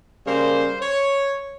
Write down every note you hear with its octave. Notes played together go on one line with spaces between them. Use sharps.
C#3 G3 A#3 C5
C#5